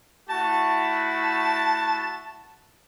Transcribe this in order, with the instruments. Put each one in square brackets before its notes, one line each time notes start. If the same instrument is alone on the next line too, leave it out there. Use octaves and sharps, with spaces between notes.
[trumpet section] A3 E4 F#4 [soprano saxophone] A5